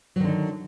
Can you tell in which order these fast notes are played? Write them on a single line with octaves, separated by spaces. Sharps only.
F#3 D#3 D3 D#4